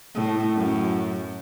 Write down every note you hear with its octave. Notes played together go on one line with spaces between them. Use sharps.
A2
F#2